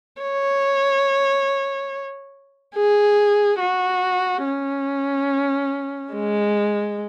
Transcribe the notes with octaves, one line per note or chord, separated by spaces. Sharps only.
C#5
G#4
F#4
C#4
G#3